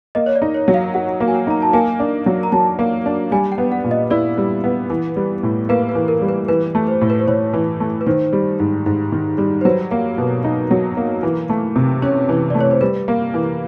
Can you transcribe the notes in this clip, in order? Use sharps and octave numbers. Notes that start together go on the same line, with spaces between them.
A#3 D#5
C#5
D5
D#4
C#5
F#3
F5
F#4 F#5
A#3
G#5
G5
D#4 A#5
A5
A#3 G#5
D4
F#3
A#5
F#3 A5
A#3
D4
G3 G#5
G5
B3
F#5
A#2
D#5
E4 D5
G3
B3
E3
G3
A2
A#3 B4
B4
E3
A#4
G3
B4
E3 B4
A3
C5
A2
B4
C5
A2 C#5
E3
A3
B4
D#3 C5
G3
G#2
G#2
D#3
G3
C5
F#3 B4
A#3
B2
D#4
F#3
A#3
E3
A3
C3
C#4 C#5
E3
A3 D5
C#5
C5
G3 B4
A#3
E3